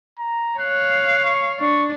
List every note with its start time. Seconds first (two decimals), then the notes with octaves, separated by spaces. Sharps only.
0.19 A#5
0.59 C#5 F5 F#6
1.24 C#6
1.60 D4 C#6